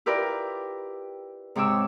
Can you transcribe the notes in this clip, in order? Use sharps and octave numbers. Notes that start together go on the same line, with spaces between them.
E4 F4 G4 A#4 B4 D5
G#2 C3 C#5 D6 E6